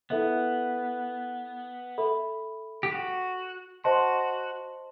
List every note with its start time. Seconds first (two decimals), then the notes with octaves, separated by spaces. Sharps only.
0.10 B3 E4 A4 E5
1.98 A4 E5 B5
2.83 G4
2.91 F#4
3.84 F#4 C5 D#5 A5 C6